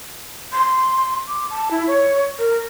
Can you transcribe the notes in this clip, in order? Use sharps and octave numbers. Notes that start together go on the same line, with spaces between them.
C6
D6
A5
E4
C#5
A#4